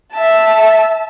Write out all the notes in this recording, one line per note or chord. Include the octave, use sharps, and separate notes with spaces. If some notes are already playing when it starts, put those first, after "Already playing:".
E5 A5